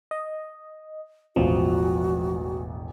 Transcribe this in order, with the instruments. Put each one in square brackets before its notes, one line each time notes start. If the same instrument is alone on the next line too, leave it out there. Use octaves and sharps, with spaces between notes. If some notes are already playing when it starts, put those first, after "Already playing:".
[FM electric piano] D#5
[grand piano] E1 A1 E2 [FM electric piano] F3 [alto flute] F#4